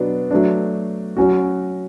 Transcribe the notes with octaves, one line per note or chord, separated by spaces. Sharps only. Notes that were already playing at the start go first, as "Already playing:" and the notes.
Already playing: B2 F#3 B3 D4
F#3 A3 D4
F#3 C#4 F#4